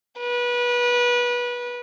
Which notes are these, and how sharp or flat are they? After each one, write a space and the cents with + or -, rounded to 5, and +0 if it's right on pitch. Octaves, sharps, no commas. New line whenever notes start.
B4 -25